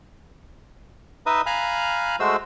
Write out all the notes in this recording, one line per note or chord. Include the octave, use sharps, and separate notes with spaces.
D#4 B4 D#5 E5 D#6
F5 G#5 A#5 B5 F6 F#6
G#3 A3 F#4 C5 E6